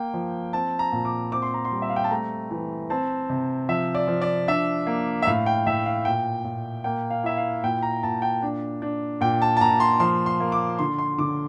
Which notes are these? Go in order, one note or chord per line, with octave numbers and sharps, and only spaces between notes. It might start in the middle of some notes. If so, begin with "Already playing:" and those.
Already playing: A#3 G5
F3
C4 A5
A#5
A#2
D6
C4 D6
C6
A#5
C6
G3
E5
F5
G5
A5
A3 A#5
E3
C4 A5
C3
F3 E5
D5
F3
D5
D4 E5
A#3
E5
A2 F5
G5
A2 E5
F5
A#2 G5
A#2
A#3 G5
F5
E4 E5
F5
A#2 G5
A#5
A#2 A5
G5
D4
D4
A#2 G5
A5
A5
A#2 A#5
C6
F3 C6
C6
A#3
D6
D3 C6
C6
D3 D6